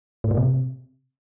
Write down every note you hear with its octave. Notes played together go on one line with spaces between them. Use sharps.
A2
A#2
C3